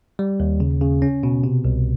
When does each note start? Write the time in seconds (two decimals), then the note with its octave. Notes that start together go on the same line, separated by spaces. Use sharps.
0.19 G3
0.40 D#2
0.60 C#3
0.81 C#3
1.02 C#4
1.23 B2
1.44 C3
1.65 C2